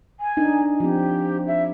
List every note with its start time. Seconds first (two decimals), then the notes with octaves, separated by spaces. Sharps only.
0.20 G#5
0.37 D4 D#4
0.80 F3 C4 G4
1.47 E5